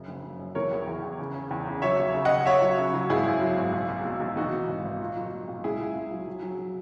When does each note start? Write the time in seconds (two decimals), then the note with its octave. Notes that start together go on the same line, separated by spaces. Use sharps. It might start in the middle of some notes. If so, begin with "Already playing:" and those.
Already playing: F#2 C#3
0.08 F#1
0.24 F#1
0.39 F#2
0.55 E3 A#4 C#5
0.71 E2
0.87 E2
1.03 E2
1.19 C#3
1.35 C#3
1.51 E2
1.67 C#3
1.82 F#3 C#5 E5
1.99 D#2
2.14 C#3
2.25 D#2 D#5 F#5
2.46 D#2 C#5 E5
2.61 F#3
2.78 C#3
2.93 F#3
3.10 G#1 E4 G#4
3.26 F#2
3.41 F#3
3.57 G#1
3.73 B1
3.89 B2
4.05 B1
4.20 B1
4.36 E3 D#4 F#4
4.53 E3
4.68 G#1
4.85 G#1
5.01 A#2
5.16 F#3
5.32 A#2
5.48 B1
5.64 C#2 E4 G#4
5.80 C#2
5.96 C#2
6.11 F#3
6.28 F#3
6.43 F#3
6.59 F#3